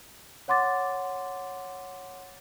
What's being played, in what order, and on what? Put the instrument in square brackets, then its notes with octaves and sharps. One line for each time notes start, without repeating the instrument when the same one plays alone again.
[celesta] C#5 F#5 C6 D6 A6